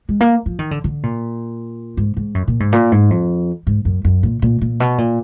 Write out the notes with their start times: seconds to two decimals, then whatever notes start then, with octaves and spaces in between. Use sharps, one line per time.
0.09 G#3
0.21 A#3
0.46 F3
0.59 D#3
0.71 D3
0.84 D3
1.03 A#2
1.97 G#2
2.17 G#2
2.35 F#2
2.48 A#2
2.60 G#2
2.72 A#2
2.92 G#2
3.10 F2
3.67 G#2
3.85 F#2
4.05 F#2
4.23 A#2
4.42 A#2
4.61 A#2
4.80 B2
4.98 A#2